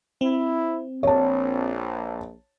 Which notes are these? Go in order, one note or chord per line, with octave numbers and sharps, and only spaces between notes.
C4 E4
A#1 C#5 A5